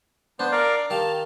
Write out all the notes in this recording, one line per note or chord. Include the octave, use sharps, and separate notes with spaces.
B3 D4 C5
A#4 D5 F5
D5
D#3 G4 F5 A5